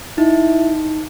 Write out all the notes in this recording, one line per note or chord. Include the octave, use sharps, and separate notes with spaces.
D#4 E4